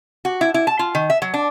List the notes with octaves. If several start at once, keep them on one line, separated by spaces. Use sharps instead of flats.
F#4
E4
E4
A5
F4
D#3
E5
F#3
D4